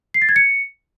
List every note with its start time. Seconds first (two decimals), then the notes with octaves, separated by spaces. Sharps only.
0.14 C7
0.22 A6
0.29 G#6
0.36 C#7